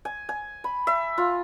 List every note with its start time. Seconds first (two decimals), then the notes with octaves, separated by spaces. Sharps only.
0.05 G#5
0.29 G#5
0.64 B5
0.87 E5
1.18 F4